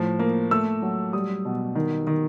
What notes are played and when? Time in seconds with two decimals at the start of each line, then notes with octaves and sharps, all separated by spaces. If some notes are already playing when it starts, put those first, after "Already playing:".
Already playing: A2 F3
0.19 A#3
0.51 A3 E6
0.82 F#3
1.13 G3 D#6
1.45 B2
1.75 D#3
2.07 D#3